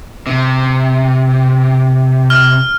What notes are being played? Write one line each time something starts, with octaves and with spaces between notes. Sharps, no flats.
C3
F6